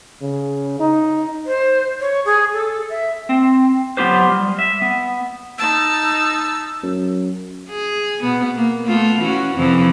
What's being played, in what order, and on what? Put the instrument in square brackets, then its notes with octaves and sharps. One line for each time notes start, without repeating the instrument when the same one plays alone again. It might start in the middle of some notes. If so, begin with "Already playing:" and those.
[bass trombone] C#3
D#4
[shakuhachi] C5
C#5
G#4
A4
E5
[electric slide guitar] C4
F#3 B3 F4 G4 C5
G3
E5
B3
[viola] D#4 A5 [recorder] E6
[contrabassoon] F#2
[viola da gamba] G#4
B2 B3
A#3
A3 B3 F4
E3 C#4 F#4
F2 C3 E3